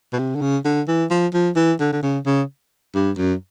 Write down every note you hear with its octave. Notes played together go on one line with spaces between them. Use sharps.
B2
C3
D3
C#3
D3
E3
F3
F3
E3
D3
D3
C#3
C#3
G2
F#2